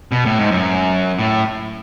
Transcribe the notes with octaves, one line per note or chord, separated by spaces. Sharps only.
B2
A2
G#2
F#2
A2